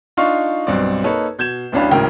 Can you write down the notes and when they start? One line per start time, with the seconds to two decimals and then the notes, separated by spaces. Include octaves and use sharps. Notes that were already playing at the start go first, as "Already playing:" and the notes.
0.17 D4 D#4 F4 F5 C6 C#6
0.67 B1 G2 B2 C4 D5
1.04 A#3 D#4 A4 B4 C#5
1.39 B2 G6 G#6 E7
1.72 D1 A1 C#4 D4 F5 B5
1.91 D1 G#1 A2 C#3 A#4 G5